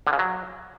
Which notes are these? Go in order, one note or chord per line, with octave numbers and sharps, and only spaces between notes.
D3
C#3
F#3